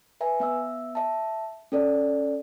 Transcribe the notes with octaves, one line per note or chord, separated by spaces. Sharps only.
B4 E5 G#5 A#5
B3 E5 E6
E5 A5
C#4 A4 D5